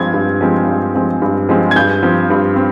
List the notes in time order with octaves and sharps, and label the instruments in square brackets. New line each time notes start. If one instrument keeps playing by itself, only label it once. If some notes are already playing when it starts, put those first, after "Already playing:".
Already playing: [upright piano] G2 F3 G#3 C4 G#6
G2
F3 G#3 C4
G2
F3 G#3 C4
G2
F3 G#3 C4
G#6
G2 G6
F3 C4
G2
C4